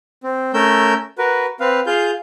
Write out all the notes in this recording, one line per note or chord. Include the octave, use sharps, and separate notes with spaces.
C4
A3 C#4 A#4 E6 G6
F#4 A#4 B4
C4 B4 F5
F4 G#4 F5 G6